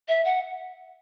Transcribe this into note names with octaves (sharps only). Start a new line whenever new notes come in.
E5
F#5